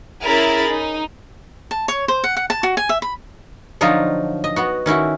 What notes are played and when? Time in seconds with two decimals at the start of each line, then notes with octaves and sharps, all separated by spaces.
0.23 C#4 E4 G#4 A#4 B5 A6
0.70 D#4
1.71 A5
1.88 C#5
2.08 C5
2.24 F#5
2.37 F#5
2.50 A5
2.63 F#4
2.77 G#5
2.89 E5
3.02 B5
3.81 D3 F3 F#3 D#4 F4 D#5
4.44 D#5
4.56 B3 F#4
4.86 D#3 C#4 E4 F#4